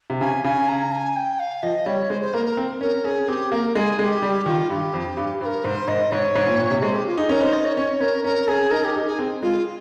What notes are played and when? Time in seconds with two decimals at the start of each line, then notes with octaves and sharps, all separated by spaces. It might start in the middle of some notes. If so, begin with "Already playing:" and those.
0.10 C3
0.21 C#3 G#5
0.44 C#3 G#5
0.68 A#5
0.92 G#5
1.16 G5
1.39 F5
1.63 F3 D#5
1.86 G3 C#5
2.10 G#3 C5
2.22 C5
2.34 A#3 A#4
2.46 A#4
2.57 C4
2.81 C#4 A#4
3.05 C#4 G#4
3.28 C4 G4
3.52 A#3 A#4
3.75 G#3 G#4
3.99 G#3 G#4
4.03 G4
4.22 G3
4.46 D#3 F4
4.70 G2 G4
4.94 F2
5.17 G2
5.40 G2 C5
5.45 A#4
5.64 G#2 C5
5.88 G#2 D#5
6.12 G#2 C#5
6.35 G#2
6.47 A#2
6.59 A#2
6.71 C3
6.82 G#3 C5
6.95 G4
7.07 F4
7.17 D#4 G#4
7.29 C#4 A#4
7.41 D#4 C5
7.53 D#5
7.65 C#5
7.77 C#4 C#5
8.01 C#4 A#4
8.24 C#4 A#4
8.48 C#4 G#4
8.71 D#4 A#4
8.84 G4
8.95 D#4
9.07 G#4
9.19 C4
9.42 G#3 F4